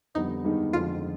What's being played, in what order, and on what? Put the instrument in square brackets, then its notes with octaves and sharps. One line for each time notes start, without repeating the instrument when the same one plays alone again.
[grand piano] F2 D3 G3 B3 [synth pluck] D#4
[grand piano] G2 D#3 G#3 B3 D#4
[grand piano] F2 D3 F3 G#3 [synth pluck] F4